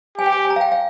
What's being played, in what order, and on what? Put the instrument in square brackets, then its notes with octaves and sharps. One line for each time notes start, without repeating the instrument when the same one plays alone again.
[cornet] G4 [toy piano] G#5
[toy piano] G5
G#5
G#5
A#5
F5
G5
F5